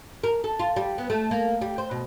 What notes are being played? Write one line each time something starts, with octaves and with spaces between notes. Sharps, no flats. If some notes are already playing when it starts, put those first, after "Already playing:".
A#4
A4
F4
G3
B3
A3
A#3
G3
C5
B2